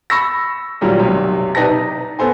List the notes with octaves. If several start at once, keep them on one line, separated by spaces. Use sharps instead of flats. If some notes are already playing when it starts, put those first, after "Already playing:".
B5 C#6 E6 A#6
A#2 D#3 F#3 G3 A#3 F4
B1 F#2 C3
C3 D#4 B4 D5 A5 A#6
D#4
B3 A4 C5 G#5